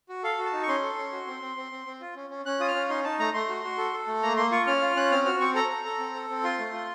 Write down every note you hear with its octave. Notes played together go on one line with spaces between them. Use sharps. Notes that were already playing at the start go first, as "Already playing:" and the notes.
F#4
A4 F5
F#4
A5
D#4
C#6
C#4 C6
A4
C#4
F#4
C4
C4
C4
C4
C4
F4
C#4
C#4
C#4 F#6
F4 D#6
F6
C#4
D#4 C6
D#4 A5
A3 A#5
A3 C6
F#4
F#4
A4
A4
A3
A#3 A#5
A#3 C6
F4 C#6
C#4 F6
F4
C#4 F#6
C4 F6
F#4 F6
C4 C#6
A4 A#5
A4
A4
C4
A4
C4
F4 C6
A3
F4